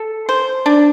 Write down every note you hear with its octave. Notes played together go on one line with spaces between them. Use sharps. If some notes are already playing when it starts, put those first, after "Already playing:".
Already playing: A4
C5
D4